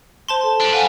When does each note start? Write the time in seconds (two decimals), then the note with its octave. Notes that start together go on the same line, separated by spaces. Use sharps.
0.29 C5 A5 C6
0.43 A4
0.60 D4 G4
0.73 G3 B4 F5 F#5 G#5